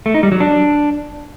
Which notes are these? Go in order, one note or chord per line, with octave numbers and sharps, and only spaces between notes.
A3
D#4
G3
F#3
D4